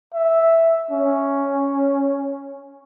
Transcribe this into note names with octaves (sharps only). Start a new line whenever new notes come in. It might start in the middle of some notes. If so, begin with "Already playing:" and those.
E5
C#4